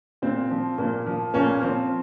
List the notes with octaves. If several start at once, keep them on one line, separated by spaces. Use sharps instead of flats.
A#2 C4
F3
A#2 A#3
F3
A#2 A#3 C#4
F3 C4